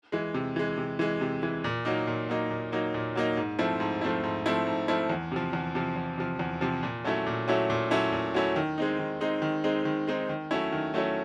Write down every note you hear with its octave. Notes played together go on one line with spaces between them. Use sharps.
E3 G#3
C3
E3 G#3
C3
E3 G#3
C3
E3 G#3
A#2
F#3 A#3 D#4
A#2
F#3 A#3 D#4
A#2
F#3 A#3 D#4
A#2
F#3 A#3 D#4
G#2
F3 A3 C4 E4
G#2
F3 A3 C4 E4
G#2
F3 A3 C4 E4
G#2
F3 A3 C4 E4
E2
C3 F3
E2
C3 F3
E2
C3 F3
E2
C3 F3
A#2
F#3 A3 C#4 E4
A#2
F#3 A3 C#4 E4
A#2
F#3 A3 C#4 E4
A#2
F#3 A3 C#4 E4
D#3
G#3 C4 D#4
D#3
G#3 C4 D#4
D#3
G#3 C4 D#4
D#3
G#3 C4 D#4
D#3
F#3 A3 C#4 E4
D#3
F#3 A3 C#4 E4